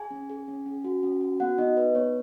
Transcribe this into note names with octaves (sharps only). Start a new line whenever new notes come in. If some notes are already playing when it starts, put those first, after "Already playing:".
Already playing: G#4 G#5
C#4
G#4
C#4
C#4
F#4
C#4
F#4
B3 F#4 F#5
B3 D#4 D#5
D#4 B4
B3 C#5